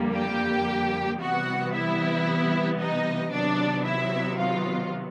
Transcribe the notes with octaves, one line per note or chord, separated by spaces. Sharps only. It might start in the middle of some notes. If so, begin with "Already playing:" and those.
Already playing: F2 D3 G3 A#3
G4 G5
C3 E3 G3 B3 F#4 F#5
E4 E5
D#4 D#5
C3 D#3 F#3 B3 D4 D5
E4 E5
F4 F5